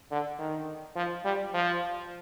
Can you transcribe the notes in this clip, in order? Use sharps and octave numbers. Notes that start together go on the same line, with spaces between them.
D3
D#3
F3
G3
F3